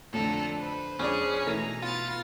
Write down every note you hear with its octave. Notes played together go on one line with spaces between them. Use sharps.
F2 A2 D3 A4 A#5
B4 C5
F2 C#4 D4 G#4 D5
B2 E3 A3 D#4 A#5
B3 F4 A6